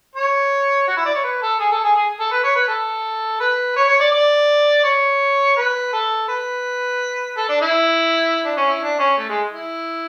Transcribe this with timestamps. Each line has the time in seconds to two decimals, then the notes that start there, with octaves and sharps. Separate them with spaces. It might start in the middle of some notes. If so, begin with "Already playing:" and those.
0.15 C#5
0.88 F#4
0.97 E4
1.06 D5
1.15 C#5
1.24 B4
1.42 A4
1.60 G#4
1.72 A4
1.84 G#4
1.96 G#4
2.20 A4
2.32 B4
2.44 C#5
2.55 B4
2.68 A4
3.40 B4
3.76 C#5
3.88 C#5
4.00 D5
4.12 D5
4.84 C#5
5.57 B4
5.93 A4
6.28 B4
7.37 A4
7.49 D4
7.61 E4
8.44 D4
8.57 C#4
8.69 E4
8.81 D4
8.99 C#4
9.17 A3
9.29 G#3
9.53 E4